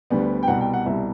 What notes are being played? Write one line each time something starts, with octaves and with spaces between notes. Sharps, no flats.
D2 D3 G3 B3
G5
C2 B2 G3 F#5
G5
F#5
C2 B2 G3 E5